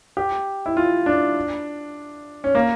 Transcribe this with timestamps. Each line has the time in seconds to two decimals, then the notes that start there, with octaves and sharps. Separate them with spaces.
0.17 G4
0.66 E4
0.77 F4
1.06 D4
2.44 C#4
2.55 A#3